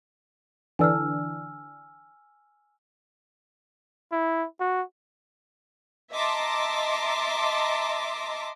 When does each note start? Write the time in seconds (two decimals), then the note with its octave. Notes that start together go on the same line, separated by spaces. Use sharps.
0.79 D3 E3 D4 G#5 E6 F6
4.12 E4
4.60 F#4
6.14 D#5 E5 A5 A#5 C6 D6